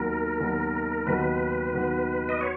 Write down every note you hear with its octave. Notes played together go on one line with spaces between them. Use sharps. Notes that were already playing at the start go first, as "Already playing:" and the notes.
Already playing: D#2 D#3 F#3 B3 F#4 A#4
D#2 D#3 F#3 B3 F#4
D#2 D#3 F#3 B3 F#4 B4
D#2 D#3 F#3 B3 F#4
D#5
F#4 C#5